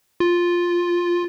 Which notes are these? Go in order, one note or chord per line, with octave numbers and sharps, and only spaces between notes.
F4